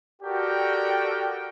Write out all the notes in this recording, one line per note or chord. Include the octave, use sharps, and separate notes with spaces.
F#4 G4 A4 A#4 D5 G5